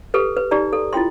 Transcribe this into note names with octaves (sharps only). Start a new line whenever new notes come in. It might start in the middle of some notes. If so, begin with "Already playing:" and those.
G4 A4 B4
B4
D#4 G4 D5 A#5
A4
E4 F4 G5 C6